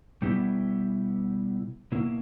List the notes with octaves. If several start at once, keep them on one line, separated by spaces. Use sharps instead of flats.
B2 G3 B3 E4 G4
B2 A#3 E4